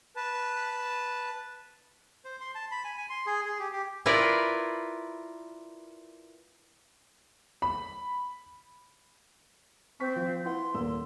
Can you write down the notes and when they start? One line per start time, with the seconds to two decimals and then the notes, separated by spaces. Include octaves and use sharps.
0.16 B4 A5
2.25 C5
2.40 C6
2.55 A5
2.71 B5
2.84 G#5
2.98 G#5
3.10 C6
3.26 G#4
3.45 G#4
3.59 G4
3.72 G4
4.06 E4 F4 A#4 B4 D5
7.62 B5
10.00 C4 C#6 B6
10.16 F3
10.45 E4 B4 F#5 C6
10.75 D#1 A#3 E6